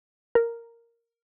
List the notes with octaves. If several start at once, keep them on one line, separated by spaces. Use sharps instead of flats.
A#4